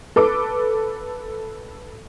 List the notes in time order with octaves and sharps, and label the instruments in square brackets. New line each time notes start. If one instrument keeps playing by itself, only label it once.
[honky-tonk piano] A4 B4 D6